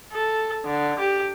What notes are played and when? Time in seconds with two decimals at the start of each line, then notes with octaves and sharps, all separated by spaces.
0.13 A4
0.65 D3
0.98 G4